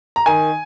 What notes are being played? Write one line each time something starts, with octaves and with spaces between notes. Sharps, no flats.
A#5
D#3 G#5